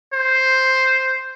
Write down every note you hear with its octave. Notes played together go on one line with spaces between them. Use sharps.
C5